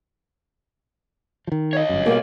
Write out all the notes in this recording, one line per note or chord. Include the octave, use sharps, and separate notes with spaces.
D#3 F3
C#5 D#5
G1 F#2
B2 G3 A#3 G#4